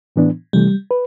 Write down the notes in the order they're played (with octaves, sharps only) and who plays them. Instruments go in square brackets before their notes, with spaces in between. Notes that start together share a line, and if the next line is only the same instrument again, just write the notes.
[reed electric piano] A2 E3 B3 D4
[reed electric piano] C3 E3 A3 [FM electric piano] G3
[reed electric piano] B4